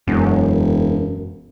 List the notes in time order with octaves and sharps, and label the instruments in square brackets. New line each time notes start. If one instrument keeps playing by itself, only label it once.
[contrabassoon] E1 [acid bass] F#2